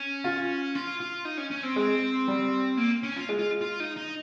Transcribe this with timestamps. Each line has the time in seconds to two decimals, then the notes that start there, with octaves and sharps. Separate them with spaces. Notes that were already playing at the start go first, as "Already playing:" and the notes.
Already playing: C#4
0.24 F4
0.75 F4
1.00 F4
1.25 D#4
1.38 C#4
1.51 C#4
1.63 C4
1.76 G#3
2.28 G3
2.77 A#3
3.03 C#4
3.16 F4
3.29 G#3
3.39 F4
3.61 F4
3.80 D#4
3.96 D#4